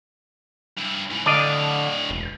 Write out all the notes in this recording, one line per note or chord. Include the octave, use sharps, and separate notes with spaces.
G2 E4
G#2 E3
A2 D3 D4 D5 D#5 F5
E1